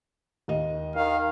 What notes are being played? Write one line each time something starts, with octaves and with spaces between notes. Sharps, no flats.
D#2 D#5
D#3 F5